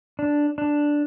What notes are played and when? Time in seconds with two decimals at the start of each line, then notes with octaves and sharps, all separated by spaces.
0.19 D4
0.58 D4